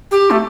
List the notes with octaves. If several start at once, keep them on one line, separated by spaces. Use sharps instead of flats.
G4
A3